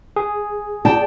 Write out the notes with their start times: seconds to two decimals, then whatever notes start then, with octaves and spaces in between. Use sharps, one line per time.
0.16 G#4
0.85 D5 G5 A5